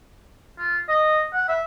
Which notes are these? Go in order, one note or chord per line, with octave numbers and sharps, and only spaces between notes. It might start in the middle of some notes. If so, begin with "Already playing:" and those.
F4
D#5
F#5
E5